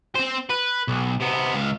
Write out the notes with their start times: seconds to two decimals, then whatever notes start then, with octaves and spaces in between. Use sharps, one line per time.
0.15 C4 C5
0.50 B4
0.88 B1
1.20 C3 B3
1.54 C#2 F5